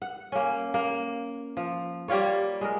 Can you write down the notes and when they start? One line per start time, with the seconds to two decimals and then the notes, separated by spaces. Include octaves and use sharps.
0.02 F#5
0.32 A#3 C#4
0.74 A#3
1.57 F3
2.08 G3 A#3 F4 C#5
2.61 G#3 A#4